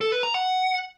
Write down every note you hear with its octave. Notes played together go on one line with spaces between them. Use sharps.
A4
B4
A#5
F#5